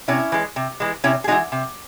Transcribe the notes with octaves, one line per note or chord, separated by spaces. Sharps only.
C3 C#4 E4
E3 G#3
C3
E3 G#3
C3 C#4 E4
G#4
E3 G#3 D#4 F#4
C3